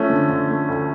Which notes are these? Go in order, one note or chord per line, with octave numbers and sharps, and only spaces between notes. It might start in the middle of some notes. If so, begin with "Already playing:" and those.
Already playing: F3 A3 C#4
D3
D3
A3
D2